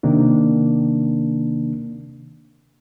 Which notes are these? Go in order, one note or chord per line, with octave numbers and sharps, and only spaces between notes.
C3 D#3 A#3 D4